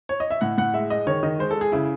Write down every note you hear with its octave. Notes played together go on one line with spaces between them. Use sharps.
C#5
D#5
E5
A2 F#5
A2 F#5
G#3 E5
G#3 D#5
D#3 C#5
D#3 D#5
G#3 C5
A4
G#3
G#4
C#3 E4